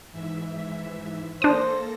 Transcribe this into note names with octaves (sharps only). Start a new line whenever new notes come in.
G#2 E3 E5
A#3 D4 A4 C5 D#6 A#6